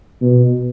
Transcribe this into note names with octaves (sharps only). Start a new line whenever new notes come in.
B2